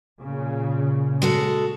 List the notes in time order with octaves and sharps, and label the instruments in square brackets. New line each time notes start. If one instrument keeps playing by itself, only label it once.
[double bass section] A#2 C#3
[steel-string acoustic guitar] G#3 F#4 A4